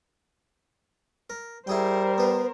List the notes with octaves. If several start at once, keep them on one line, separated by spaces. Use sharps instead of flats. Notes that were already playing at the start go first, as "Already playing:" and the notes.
A#4
G3 E4 G#4 A#4 C5 G5
B3 B4